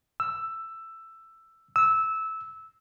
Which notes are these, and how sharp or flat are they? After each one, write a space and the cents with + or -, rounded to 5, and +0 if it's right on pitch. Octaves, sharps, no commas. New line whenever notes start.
E6 +10
E6 -15